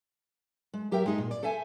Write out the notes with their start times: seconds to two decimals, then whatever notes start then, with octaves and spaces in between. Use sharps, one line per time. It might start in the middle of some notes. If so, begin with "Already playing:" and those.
0.74 G#3
0.91 F#3 G4 A#4 E5 G5
1.06 G#3 D#4
1.18 A#2
1.31 D5
1.43 A4 C5 E5 G#5